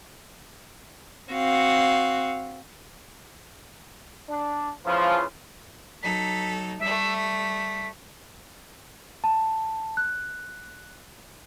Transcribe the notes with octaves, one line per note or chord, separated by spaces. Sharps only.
C4 F#4 F5
D4
C#3 E3 F3 F4
F#3 D#4 A4 B6
G3 A3 E5
B6
A5
F#6